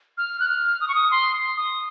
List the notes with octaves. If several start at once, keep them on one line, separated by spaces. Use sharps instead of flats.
F6
F#6
F6
D#6
C#6
D#6
C6
D#6